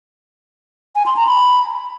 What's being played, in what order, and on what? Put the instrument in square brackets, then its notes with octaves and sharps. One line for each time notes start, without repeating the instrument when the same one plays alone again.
[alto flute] G#5
C6
A#5
B5